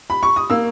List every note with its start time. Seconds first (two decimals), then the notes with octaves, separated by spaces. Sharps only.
0.10 B5
0.23 C#6
0.36 D#6
0.50 A#3 E6